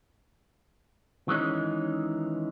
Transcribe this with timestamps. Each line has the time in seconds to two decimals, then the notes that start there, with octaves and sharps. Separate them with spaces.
1.28 D#3 E3 G#3 C#4 D#4